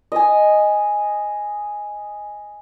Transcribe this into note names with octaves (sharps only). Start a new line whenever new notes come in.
D#5 G#5